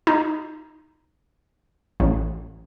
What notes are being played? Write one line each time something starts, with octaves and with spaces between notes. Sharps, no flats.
D#4
A1